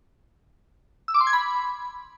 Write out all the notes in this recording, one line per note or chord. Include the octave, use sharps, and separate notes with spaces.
E6
D6
C6
G#6
B5